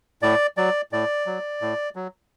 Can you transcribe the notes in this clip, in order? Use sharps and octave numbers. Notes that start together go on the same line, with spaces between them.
A2 D5
F#3 D5
A2 D5
F#3
A2
F#3